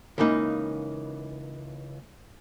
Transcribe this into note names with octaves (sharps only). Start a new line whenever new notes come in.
C#2 E3 A#3 D#4